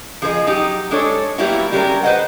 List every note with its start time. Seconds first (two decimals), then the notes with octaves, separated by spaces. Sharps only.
0.22 F3 G#4 B4 D#5
0.47 F#3 D#4 G4
0.91 G#3 D4 A4 C#5
1.38 F#3 G3 A#3 B3 E4 F#4
1.72 G3 G#3 C#4 A#4
2.03 B4 C5 D#5 F#5